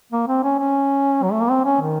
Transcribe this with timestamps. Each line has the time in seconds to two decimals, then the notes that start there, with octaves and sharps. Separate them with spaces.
0.13 A#3
0.28 C4
0.43 C#4
0.59 C#4
1.23 F#3
1.32 A3
1.41 A#3
1.50 C4
1.65 C#4
1.81 D#3